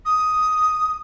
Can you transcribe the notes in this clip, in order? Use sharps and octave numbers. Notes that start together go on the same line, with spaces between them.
D#6